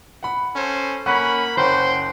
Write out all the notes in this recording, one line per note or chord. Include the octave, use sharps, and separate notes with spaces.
F#5 B5
C#4 A4 C5
A#3 C#4 F#5 B5 C#6 F#6
F#1 C#4 C5 F#5 G5 C6